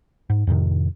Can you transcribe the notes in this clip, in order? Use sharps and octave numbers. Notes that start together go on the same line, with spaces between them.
G#2
F2 A2 C3 D#3